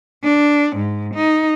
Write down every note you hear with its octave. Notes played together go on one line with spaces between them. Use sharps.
D4
G#2
D#4